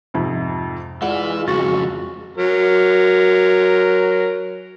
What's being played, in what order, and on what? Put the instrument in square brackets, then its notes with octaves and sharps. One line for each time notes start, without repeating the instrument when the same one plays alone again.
[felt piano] F2 G#2 C3
[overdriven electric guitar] E3 E4 [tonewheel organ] G#3 F4 [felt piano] D5 F#5
[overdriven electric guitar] F2 C#3 [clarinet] F#4 [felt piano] A6
[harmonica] F#3 A#4